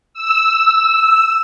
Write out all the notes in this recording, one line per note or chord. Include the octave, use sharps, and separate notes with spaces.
E6